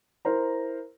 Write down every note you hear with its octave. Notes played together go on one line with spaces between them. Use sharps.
E4 A#4 C5 A#5